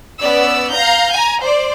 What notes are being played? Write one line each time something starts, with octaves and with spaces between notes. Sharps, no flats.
B3 C#4 D5 E6
F5 A#5 G6
G#5 A#5
C5 D5